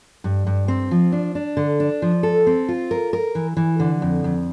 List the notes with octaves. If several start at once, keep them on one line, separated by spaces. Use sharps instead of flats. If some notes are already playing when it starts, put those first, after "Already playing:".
G2
G2
C4
F3
D4
D4
D3
D4
F3
A4
C4
F4
A#4
A#4
E3
E3
D3
F2
F2